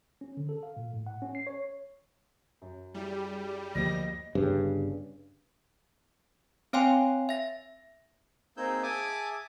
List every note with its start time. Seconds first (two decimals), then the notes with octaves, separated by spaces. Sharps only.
0.21 C#4
0.37 D3
0.49 A4
0.63 F5
0.77 A#2
0.94 A2
1.07 F#5
1.22 C#4
1.35 C7
1.47 C#5
2.61 F#2
2.94 G3 E4 G#4
3.75 D2 F3 A#3 D#5 A#6
4.35 G1 G2 C#3
6.73 C4 C#5 F5 G5 G#5 C6
7.29 E5 A#6
8.57 A#3 C4 D#4 G#4 E6 G6
8.83 G#4 E5 G#5 A5 D6 D#6